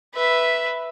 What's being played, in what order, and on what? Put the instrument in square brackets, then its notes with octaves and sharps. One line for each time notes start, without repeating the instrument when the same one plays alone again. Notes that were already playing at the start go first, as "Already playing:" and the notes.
[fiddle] B4 E5